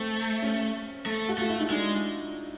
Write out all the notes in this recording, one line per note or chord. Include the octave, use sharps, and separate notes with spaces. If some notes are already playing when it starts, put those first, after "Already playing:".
Already playing: A3 C4
C#4
A3
F#4
A3 F4
E4
D#4
G#3 D4